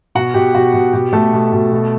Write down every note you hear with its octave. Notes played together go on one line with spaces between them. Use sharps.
B2 F#4 F#5
B2 G4
B2 F#4
B2
B2 G4
B2 A3 A4
B2
B2
B2